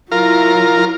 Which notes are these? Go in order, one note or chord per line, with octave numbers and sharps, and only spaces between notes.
F#3 E4 F4 A#4